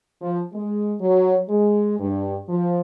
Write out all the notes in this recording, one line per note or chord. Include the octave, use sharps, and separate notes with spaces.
F3
G#3
F#3
G#3
G2
F3